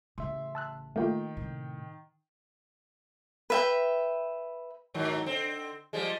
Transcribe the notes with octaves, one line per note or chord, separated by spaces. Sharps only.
A1 C#3 E5 C6
A5 E6 F#6
D#3 A3 A#3 F4 G5
A2 C3
B4 E5 G5
G#2 D#3 F#3
D3 C4
F3 G3 G#3